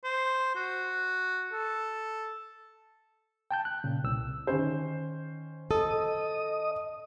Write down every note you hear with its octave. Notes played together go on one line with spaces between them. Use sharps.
C5
F#4
A4
G5 A5 G6
F#6
A#2 C#3
C2 E6
D#3 C#4 C5
A4 D#5 D#6